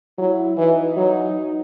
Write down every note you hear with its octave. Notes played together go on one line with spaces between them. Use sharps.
F#3 E4
E3 D#4
F#3